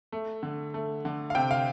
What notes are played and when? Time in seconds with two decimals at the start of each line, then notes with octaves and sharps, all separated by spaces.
0.12 A3
0.43 D3
0.74 A3
1.05 D3
1.30 F5
1.35 C3 G5
1.51 F5